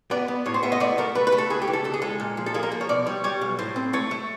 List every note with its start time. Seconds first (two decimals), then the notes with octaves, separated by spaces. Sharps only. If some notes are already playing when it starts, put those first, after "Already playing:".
0.11 B3 D5
0.28 B3
0.46 A2 C#5
0.54 C5
0.63 B3 E5
0.72 D#5
0.80 A3 D5
0.98 A3 A#4
1.15 A3 B4
1.27 B4
1.32 A3
1.38 A4
1.50 C#2 G#4
1.62 G4
1.68 E3
1.73 A4
1.84 C#2 A4
1.94 G#4
2.02 G#3 A4
2.20 A#2
2.37 F3
2.46 A4
2.54 A#3 G#4
2.63 A#4
2.72 F3
2.81 C#5
2.89 B2 D5
3.07 G3 C#5
3.24 G3 C#5
3.42 B1
3.59 A2 C5
3.76 C4
3.93 A3 C#5
4.11 A3